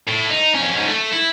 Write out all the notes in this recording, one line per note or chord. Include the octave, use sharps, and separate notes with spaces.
A2
D#4
F2 C#4
G#2 C#4
A3
E4